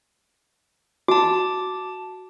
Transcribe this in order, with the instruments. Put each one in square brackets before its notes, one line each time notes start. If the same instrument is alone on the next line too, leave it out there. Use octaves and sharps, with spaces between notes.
[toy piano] F#4 [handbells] A5 D6